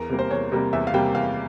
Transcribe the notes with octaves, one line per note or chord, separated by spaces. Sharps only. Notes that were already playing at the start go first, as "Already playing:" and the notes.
Already playing: E2 A#4
C3 G3 A#3
C5
E2 C#5
C3 G3 A#3
E2 E5
F5
C3 G3 A#3 G5
E2 F5